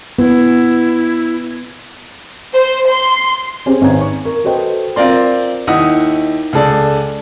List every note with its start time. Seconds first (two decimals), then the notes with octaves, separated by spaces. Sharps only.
0.19 B3 E4
2.53 C5
2.89 C6
3.66 C4 C#4 G4 G#4 C5
3.81 G#1 D#3 C#4 B4 A#5 G#6
4.00 C#6
4.25 A#4
4.45 F#4 A4 B4 C5 D#5 G5
4.96 C4 F4 A#4 D5 C6
5.67 D#2 D#4 E4 F#5 D#6
6.53 C#2 G#4 A4 D5